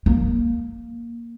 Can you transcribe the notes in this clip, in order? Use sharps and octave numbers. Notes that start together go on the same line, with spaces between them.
A#3